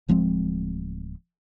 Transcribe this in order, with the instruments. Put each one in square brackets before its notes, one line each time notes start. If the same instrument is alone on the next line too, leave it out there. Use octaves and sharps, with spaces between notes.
[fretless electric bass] D1 F3 G#3 C4